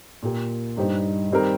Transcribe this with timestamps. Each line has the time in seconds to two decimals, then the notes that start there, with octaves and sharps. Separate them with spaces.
0.23 A#2 A#3 G4 A#4
0.77 G2 G3 D#4 G4 C5
1.31 D#3 G3 C4 G4 A#4